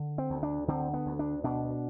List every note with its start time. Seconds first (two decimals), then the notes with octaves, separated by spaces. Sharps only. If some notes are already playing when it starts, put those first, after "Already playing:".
Already playing: D3
0.18 C4
0.30 D2
0.43 D4
0.68 D3 C4
0.94 B3
1.06 D2
1.19 D4
1.44 B2 D4